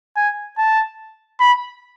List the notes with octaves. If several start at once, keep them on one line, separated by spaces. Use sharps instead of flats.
G#5
A5
B5